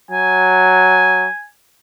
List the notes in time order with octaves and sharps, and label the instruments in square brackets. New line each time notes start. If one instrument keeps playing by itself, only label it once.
[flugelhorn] F#3 [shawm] G#5